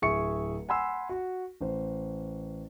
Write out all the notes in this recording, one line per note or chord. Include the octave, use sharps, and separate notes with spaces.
D1 G#4 E5 C#6 C#7
F#5 G#5 B5 C6 E6
F#4
A1 C5